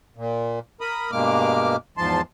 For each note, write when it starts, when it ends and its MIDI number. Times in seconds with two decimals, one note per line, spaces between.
0.17 0.59 46
0.81 1.11 70
0.81 1.11 83
0.81 1.11 87
1.12 1.76 43
1.12 1.76 47
1.12 1.76 56
1.12 1.76 58
1.12 1.76 86
1.12 1.76 89
1.97 2.21 40
1.97 2.21 44
1.97 2.21 53
1.97 2.21 81
1.97 2.21 84